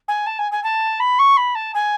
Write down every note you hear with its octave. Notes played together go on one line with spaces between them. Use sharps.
G#5
A5
G#5
G#5
A5
B5
C#6
B5
A5
G#5